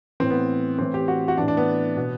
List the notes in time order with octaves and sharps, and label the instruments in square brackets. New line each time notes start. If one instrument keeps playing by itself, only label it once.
[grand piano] A2 E3 C4
B3
A2 E3 C4
G4
F#4
F#4
A2 E3 D4
D4
B3
B2